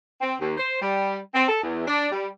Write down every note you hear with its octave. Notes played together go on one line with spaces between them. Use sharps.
C4
D#2
C5
G3
C4
A4
E2
D4
G3